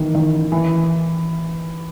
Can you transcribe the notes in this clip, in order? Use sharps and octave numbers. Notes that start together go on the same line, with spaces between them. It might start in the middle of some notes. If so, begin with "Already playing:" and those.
Already playing: D#3 E3
D#3
E3